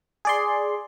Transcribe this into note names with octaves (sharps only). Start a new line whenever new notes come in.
G#4 D5 C6